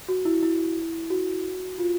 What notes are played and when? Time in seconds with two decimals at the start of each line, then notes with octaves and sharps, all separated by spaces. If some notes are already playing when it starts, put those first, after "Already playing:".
0.08 F#4
0.25 E4
0.42 E4
1.10 F#4
1.79 F4